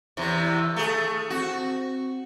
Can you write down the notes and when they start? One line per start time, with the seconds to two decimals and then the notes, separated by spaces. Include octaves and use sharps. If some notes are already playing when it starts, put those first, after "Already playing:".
0.17 E2 C3 E3
0.76 A3 G#4
1.30 C4 F#4